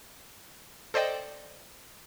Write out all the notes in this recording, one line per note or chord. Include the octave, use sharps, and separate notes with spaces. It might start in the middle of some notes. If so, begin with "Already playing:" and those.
A4 C5 D5 D#5 G5